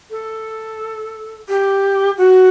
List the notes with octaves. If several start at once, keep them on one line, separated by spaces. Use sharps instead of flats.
A4
G4
F#4